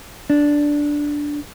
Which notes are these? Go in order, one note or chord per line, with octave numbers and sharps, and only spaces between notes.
D4